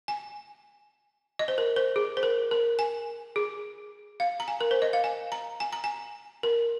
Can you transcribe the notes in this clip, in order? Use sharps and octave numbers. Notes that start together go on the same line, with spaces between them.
G#5
D#5
C5
A#4
C5
G#4
C5
A#4
A#4
G#5
G#4
F5
A#5
G#5
A#4
C5
D#5
F5
G#5
A#5
G#5
A#5
G#5
A#4